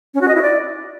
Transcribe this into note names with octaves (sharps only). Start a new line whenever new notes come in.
C#4
F#4
D#5
E4
D5